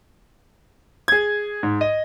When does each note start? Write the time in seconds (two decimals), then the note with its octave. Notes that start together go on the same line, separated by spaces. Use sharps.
1.08 G#4 G#6
1.63 G#2
1.81 D#5